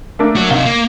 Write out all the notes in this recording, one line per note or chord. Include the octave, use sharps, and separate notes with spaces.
A3 A#3 D4
F#3 F#4
C3 D#4 F5
A#3